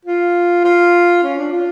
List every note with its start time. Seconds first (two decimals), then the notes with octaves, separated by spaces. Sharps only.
0.05 F4
0.64 F4
1.23 C#4
1.38 D4
1.52 F4